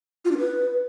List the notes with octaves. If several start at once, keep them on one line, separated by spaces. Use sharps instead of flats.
F4
D4
B4